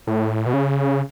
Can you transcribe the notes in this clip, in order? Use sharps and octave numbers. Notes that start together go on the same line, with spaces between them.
A2
B2
C#3